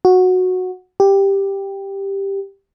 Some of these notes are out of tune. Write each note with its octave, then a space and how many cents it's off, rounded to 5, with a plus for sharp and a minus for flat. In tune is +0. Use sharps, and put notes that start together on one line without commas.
F#4 -10
G4 +5